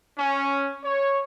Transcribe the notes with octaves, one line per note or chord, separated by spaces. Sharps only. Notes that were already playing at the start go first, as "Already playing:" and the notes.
C#4
C#5